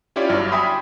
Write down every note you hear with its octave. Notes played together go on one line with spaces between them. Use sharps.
C#4 E4 F4 G4 C#5 D5
G1 G2 F#3 D5 F6
E5 G5 G#5 B5 C6 D#6